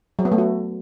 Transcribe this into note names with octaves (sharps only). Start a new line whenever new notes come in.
F#3
B3
A3
F#4